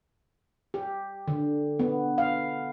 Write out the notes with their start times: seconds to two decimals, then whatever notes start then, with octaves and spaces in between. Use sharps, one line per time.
0.74 G4
1.28 D3
1.79 B3
2.18 F5